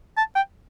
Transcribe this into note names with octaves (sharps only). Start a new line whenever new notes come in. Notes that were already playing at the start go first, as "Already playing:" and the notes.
A5
G5